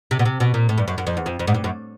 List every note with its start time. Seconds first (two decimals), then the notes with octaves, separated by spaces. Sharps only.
0.11 C3
0.19 B2
0.25 C3
0.40 B2
0.54 A#2
0.69 A2
0.78 G2
0.88 F#2
0.98 F#2
1.07 F2
1.17 E2
1.26 F2
1.39 F2
1.47 G#2
1.54 G2
1.64 F#2